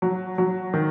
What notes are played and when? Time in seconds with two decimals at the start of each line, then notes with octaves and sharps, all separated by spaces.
0.02 F#3
0.38 F#3
0.74 D#3